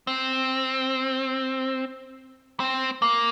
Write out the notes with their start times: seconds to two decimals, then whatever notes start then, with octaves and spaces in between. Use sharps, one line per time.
0.07 C4
2.60 C4
3.02 A#3